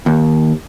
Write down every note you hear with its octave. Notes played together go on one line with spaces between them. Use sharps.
D#2